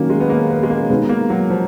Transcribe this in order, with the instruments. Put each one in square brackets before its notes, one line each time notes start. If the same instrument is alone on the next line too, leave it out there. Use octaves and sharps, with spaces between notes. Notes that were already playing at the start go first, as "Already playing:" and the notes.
Already playing: [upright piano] D#3 F#3 C#4 [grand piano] A#3
[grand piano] G#3
B3
A#3
B3
G#3
A#3
[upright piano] B2 G#3 D#4 [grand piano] B3
[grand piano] A#3
F#3
F3